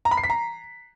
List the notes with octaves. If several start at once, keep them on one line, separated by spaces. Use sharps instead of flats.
A#5
B5
C7
B6
A#5